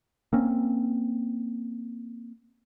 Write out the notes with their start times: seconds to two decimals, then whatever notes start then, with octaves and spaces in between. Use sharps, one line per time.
0.33 A#3 C4 C#4